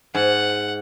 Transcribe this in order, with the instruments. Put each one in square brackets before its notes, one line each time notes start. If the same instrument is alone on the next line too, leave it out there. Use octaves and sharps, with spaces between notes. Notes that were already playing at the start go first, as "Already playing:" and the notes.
[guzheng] G#2 [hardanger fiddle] F#5